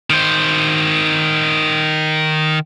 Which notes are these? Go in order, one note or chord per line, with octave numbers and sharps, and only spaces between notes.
D#3 C5